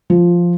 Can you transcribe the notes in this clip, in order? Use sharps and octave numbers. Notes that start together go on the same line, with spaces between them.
F3